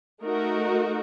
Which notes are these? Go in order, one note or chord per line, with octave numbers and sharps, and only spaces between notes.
A3 D#4 F#4 A#4